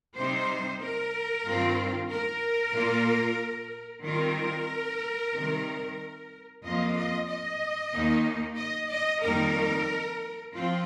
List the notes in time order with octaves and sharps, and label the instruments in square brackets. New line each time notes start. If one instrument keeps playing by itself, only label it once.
[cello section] C3 G3 D#4 C5
A#4
G2 D#3 C4 F4
A#4
A#2 A#3 F4
D#3 G3 C4 F4 A#4
C3 D#3 G3
F2 F3 A#3 F4 D#5
D#5
D#5
D#2 D#3 A#3 D#4
D#5
D#5
F2 D#3 G3 A#3 D#4 A#4
F3 C4 F4